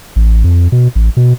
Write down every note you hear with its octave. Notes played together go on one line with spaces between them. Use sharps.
A1
F2
B2
A1
B2